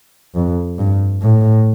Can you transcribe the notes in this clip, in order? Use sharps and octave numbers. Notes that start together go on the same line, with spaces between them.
F2
G2
A2